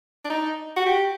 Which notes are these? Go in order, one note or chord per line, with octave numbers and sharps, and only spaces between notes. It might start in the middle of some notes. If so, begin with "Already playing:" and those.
D4
D#4
F#4
G4